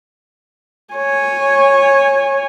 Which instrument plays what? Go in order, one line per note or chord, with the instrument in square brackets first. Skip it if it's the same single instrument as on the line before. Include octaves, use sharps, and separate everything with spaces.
[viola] C#5 G#5